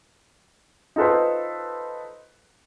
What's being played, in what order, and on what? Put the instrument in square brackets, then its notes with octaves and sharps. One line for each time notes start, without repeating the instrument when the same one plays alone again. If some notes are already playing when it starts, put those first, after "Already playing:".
[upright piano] D#4 F4 A4 B4 C5